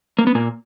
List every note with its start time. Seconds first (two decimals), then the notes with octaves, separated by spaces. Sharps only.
0.19 A#3
0.27 B3
0.35 A#2 A#3